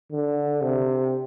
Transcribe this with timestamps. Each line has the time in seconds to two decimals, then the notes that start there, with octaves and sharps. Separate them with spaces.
0.12 D3
0.62 C3